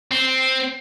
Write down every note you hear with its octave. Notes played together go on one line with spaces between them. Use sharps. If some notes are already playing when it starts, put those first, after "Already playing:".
C4